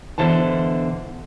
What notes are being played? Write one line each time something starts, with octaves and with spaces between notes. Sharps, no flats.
B2 D3 E3 C5 A5